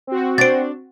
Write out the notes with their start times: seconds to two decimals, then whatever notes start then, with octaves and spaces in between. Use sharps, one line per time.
0.07 C4 F#4
0.38 D4 C5 A6 D7